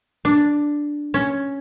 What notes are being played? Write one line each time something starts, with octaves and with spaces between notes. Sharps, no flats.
D4
C#4